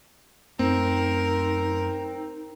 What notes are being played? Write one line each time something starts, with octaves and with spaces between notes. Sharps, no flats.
F#2 A3 C4 D#4 A#4